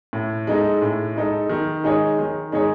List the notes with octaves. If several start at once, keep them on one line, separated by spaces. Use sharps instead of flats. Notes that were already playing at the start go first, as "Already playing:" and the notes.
A2
G#3 D#4 A4
A2
G#3 D#4 A4
D#3
G#3 D#4 G#4 C#5
D#3
G#3 D#4 G#4 C#5